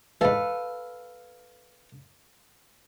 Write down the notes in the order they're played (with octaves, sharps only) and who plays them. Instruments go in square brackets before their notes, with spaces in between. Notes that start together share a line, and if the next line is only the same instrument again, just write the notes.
[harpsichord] G#2 E3 [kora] A4 B4 [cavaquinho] F5